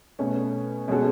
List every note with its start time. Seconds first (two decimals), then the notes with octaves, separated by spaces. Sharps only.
0.19 B2 A3 C#4
0.88 B2 G#3 C#4 F#4 A4